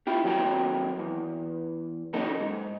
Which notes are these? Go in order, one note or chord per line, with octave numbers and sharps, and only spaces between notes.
E4 F4 G4
D#2 F#3 F#4 C#5 G5 A5
E2
C#3 F#3 A#3 D#4 A4
G#2